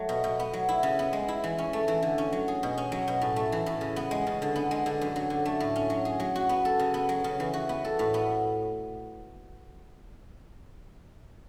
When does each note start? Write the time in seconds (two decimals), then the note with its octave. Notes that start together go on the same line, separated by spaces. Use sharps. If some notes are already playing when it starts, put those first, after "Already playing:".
Already playing: F#3 A3
0.09 B2
0.24 B2
0.39 B3
0.54 F#3
0.69 E4
0.83 C#3
0.99 B3
1.13 G#3
1.28 E4
1.44 E3
1.58 C#4
1.73 A3
1.88 E3
2.03 D3
2.18 C#4
2.32 F#3
2.48 G#4
2.63 B2
2.78 C#4
2.92 F#3
3.08 B2
3.21 A2
3.36 A3
3.52 E3
3.66 A2
3.81 C#3
3.96 B3
4.11 G#3
4.27 C#3
4.42 D3
4.56 B3
4.71 G#3
4.86 D3
5.01 F#2
5.16 F#3
5.30 D3
5.46 A3
5.60 A2
5.76 C#4
5.90 F#3
6.05 G#4
6.20 F#3
6.36 F#4
6.49 B3
6.65 A4
6.79 C#3
6.94 B3
7.09 F#3
7.24 C#3
7.40 E3
7.54 F#4
7.69 B3
7.85 A4
7.99 A2
8.14 B3